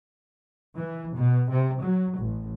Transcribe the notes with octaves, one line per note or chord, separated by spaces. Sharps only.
E3
B2
C3
F#3
A1